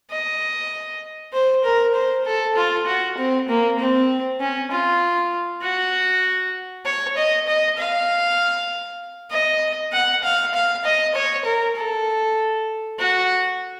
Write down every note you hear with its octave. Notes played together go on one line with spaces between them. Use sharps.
D#5
C5
A#4
C5
A4
F4
F#4
C4
A#3
C4
C#4
F4
F#4
C#5
D#5
D#5
F5
D#5
F#5
F5
F5
D#5
C#5
A#4
A4
F#4